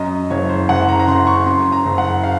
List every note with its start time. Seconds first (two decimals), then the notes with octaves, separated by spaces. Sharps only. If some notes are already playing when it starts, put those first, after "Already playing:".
Already playing: F#2 D#5
0.30 F#1 C#5
0.49 C5
0.69 F#1 F#5
0.89 A#5
0.99 A#5
1.07 C#3 C6
1.27 C#6
1.46 F#2 C6
1.72 A#5
1.85 F#1
1.98 F#5
2.23 F5